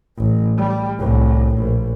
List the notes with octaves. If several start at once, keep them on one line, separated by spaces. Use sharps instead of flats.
A1
G3
C2 A2
A#1